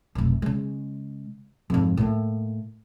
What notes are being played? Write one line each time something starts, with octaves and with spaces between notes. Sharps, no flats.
F1 B1
C#3 G#3
F2 G#2
A2 A#3